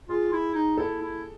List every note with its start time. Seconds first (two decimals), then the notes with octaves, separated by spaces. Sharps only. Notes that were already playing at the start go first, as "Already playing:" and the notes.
0.09 F4 G#4
0.32 E4
0.55 D#4
0.77 E4 A4
1.01 E4